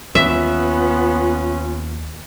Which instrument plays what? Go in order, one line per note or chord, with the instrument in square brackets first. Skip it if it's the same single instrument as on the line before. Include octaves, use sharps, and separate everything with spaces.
[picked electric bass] D#2 [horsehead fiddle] B3 F4 [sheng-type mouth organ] C#4 [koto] E5